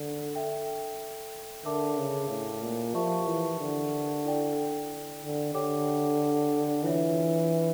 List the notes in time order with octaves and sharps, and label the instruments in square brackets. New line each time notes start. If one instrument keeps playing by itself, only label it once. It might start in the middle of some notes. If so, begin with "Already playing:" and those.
Already playing: [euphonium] D3 [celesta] D4 A4
[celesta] A4 E5 G5
[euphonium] D3 [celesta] A#4 E5 A5 D6
[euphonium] C#3
A2
A#2
[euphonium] F3 [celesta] G4 A#4 E5 A5 C#6
[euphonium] E3
D3
[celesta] E4 A4 D5 G5
[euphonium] D3
[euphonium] D3 [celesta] G4 C#5 G5 D6
[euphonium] E3 [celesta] D4 F4 C#5 E5